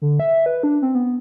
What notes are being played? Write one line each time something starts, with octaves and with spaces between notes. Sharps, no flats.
D3
E5
B4
D4
C4
B3